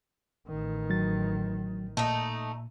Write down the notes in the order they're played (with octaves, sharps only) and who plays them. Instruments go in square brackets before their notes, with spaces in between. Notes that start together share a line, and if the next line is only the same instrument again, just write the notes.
[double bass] A1 D#3
[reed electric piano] F#3 A6
[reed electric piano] A#2 [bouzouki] A3 D#4